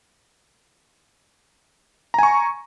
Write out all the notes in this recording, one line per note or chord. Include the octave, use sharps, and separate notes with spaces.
G#5 A#5 C#6